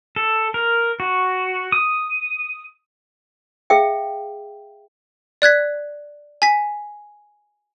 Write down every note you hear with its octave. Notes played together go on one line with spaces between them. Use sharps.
A4
A#4
F#4
D#6
G#4 E5 F5 G5
D5 F#6 G#6 B6
G#5 B6